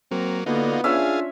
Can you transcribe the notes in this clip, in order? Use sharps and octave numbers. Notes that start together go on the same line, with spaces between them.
F#3 A#3 C4
D3 A#3 B3 D#4 F4 F#4
C#4 D4 F4 G#4 E5 F5